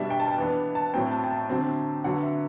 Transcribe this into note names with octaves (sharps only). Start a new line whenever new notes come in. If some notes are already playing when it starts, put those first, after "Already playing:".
Already playing: B2 G3 D4 E5
G5
A5
G5
E3 B3 D4
A5
A2 F#3 C4 G5
A5
G5
A5
D3 F#3 C4
D3 F#3 B3 F#5
E5